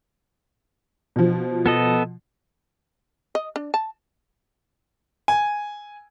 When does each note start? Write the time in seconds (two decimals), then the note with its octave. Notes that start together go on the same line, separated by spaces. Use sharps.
1.16 B2 F3
1.66 B3 A4 D#5
3.35 D#5
3.56 D4
3.74 A5
5.28 G#5